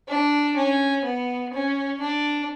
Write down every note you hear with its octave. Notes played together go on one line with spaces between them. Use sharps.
D4
C#4
B3
C#4
D4